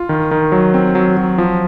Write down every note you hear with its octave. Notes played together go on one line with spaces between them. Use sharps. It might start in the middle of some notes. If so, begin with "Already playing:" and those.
Already playing: F4
D#3
D#3
F#3
C4
F#3
F#3
F3